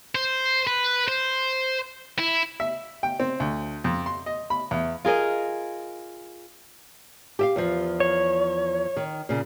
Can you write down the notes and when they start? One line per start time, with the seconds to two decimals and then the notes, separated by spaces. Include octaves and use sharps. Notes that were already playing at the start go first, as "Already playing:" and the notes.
0.15 C5
0.67 B4
1.08 C5
2.19 E4
2.60 E5
3.03 G5
3.20 C4
3.40 D2
3.84 F2
4.06 C6
4.26 D#5
4.50 B5
4.71 E2
5.05 F4 G#4 A#4 D#5
7.39 G4 E5 F5
7.56 E2 F3
8.00 C#5
8.97 D#3
9.29 A#2 C#3